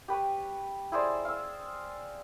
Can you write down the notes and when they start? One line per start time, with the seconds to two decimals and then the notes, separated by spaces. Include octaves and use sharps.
0.08 G4 B4 C#5
0.92 E4 G#4 C5 D5
1.25 F5 E6